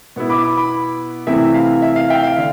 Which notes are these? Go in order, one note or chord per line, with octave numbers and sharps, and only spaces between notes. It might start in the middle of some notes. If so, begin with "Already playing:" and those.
B2 B3 E4
B5 D6
B5 D6
B5 D6
C3 E3 A3 C4 E4 E5
F5
E5
F5
E5 G5
F5
D3